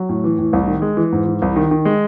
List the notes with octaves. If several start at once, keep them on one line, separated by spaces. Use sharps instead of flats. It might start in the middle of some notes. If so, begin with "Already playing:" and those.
Already playing: F#3
A2
E3
A2
C2
D#3
G#3
E3
G#2
E3
C2
D#3
D#3
G#3